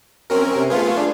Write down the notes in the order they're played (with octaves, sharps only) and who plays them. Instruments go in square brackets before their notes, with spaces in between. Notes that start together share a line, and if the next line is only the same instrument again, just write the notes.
[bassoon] F#2 [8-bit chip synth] C4 C#4 A#4
[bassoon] C3
[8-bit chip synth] A3 F4 G#4 [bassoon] B3
[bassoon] D4